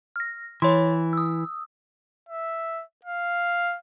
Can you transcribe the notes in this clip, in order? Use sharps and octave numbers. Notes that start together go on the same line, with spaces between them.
F6 A#6
E3 C#5 C6
D#6 E6
E5
F5